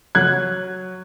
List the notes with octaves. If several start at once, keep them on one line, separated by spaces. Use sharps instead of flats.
F#3 F#6 G#6